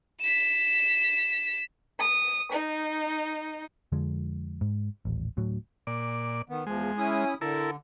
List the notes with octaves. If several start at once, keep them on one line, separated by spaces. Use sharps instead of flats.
B6 E7
D#6
D#4
F2 D3 F3 G#3
G#2
D#1 A1
D2 A2 F#3
A#2 D5
D#3 B3
E2 F3 G#3
C#4 E4 D#6
D3 E4 A4 A#4